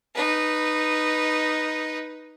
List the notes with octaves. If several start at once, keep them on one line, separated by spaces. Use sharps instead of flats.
D#4 B4